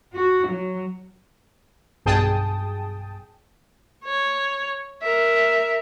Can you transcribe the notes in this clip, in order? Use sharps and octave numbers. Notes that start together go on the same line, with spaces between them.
F#4
F#3
B1 G2 G#4 G5 A5 D#6
C#5
A#4 E5